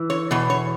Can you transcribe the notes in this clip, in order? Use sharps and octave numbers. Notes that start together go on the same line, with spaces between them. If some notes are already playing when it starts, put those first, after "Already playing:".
Already playing: E3
C#5
E2 B2
C#5